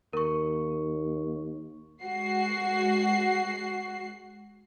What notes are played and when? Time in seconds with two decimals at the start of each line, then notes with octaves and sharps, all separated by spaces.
0.13 D#2 A#4 C#6
2.03 G#3 F#4 C7